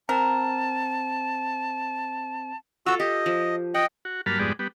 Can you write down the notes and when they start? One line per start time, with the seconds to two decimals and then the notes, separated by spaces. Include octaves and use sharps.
0.09 C4 A#4 A5
2.86 F4 F#4 A4 E6
3.00 G4 D#5
3.26 F3
3.74 D#5 F#5 G5
4.05 F#4
4.26 G2 F#3 A#3 A5 B5 F6
4.39 F2 G#2 G3 G#3 B3 D5
4.59 G3 B3